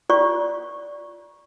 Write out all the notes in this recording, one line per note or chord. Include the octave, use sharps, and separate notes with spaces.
F4 D5 C#6